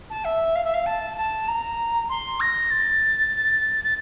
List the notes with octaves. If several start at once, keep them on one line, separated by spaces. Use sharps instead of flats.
A5
E5
F5
E5
F5
A5
A5
A#5
C6
A#6
A6
A6